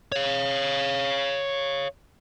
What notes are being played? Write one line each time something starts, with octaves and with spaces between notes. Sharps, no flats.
C#5 F5